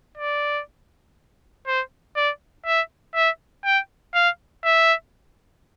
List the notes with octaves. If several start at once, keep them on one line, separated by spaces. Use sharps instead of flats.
D5
C5
D5
E5
E5
G5
F5
E5